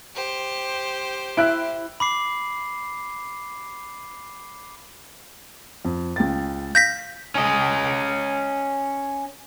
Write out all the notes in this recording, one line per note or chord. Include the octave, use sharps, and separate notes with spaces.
G4 C5
E4 E5 F#6 D7
B5 D6 C7
F2
C#2 G5 A6
F5 G6 A#6 B6
C#4 D#5